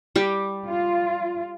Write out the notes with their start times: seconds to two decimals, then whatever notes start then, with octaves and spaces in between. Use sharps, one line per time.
0.16 G3 G4
0.67 F4